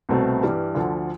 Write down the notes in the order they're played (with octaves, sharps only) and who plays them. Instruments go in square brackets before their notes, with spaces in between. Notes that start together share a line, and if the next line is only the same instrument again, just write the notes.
[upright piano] C2 B2 A3 C4
G2 E3 G3
D2 D3 F3